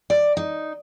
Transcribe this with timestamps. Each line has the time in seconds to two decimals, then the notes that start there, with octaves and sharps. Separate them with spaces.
0.10 D5
0.37 D#4